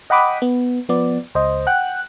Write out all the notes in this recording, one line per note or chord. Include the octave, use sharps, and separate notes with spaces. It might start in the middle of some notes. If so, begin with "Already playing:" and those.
D#5 F#5 G5 B5 D6 D#6
B3
F3 B3 D5
C#2 C5 D#5
F#5 G5 F#6